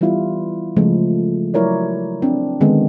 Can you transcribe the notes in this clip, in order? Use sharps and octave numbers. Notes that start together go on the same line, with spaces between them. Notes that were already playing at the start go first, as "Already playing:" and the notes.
E3 G3 B3 E4 F4
C#3 F3 G#3 A3 A4
F#3 E4 A#4 C#5 D5
C4 D4
D3 D#3 G#3 B3 C4